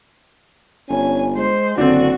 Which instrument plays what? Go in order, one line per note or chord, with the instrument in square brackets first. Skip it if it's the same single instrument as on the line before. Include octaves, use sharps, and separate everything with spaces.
[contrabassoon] G1 [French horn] C#4 [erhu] G#5
[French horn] G#3 [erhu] C5
[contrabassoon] F#1 [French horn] D3 [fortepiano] C4 D4 [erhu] F#4